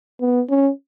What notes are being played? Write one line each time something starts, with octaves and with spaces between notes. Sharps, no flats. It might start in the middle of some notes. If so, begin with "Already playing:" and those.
B3
C#4